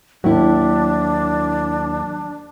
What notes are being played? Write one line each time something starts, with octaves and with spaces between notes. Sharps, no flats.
D#2 F#3 D4 E4